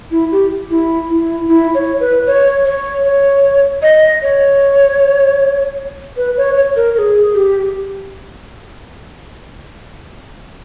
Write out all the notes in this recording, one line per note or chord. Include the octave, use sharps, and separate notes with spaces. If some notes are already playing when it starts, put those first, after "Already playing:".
E4
G4
E4
E4
E4
C#5
B4
C#5
C#5
C#5
D#5
C#5
B4
C#5
C#5
A#4
A#4
G#4
G4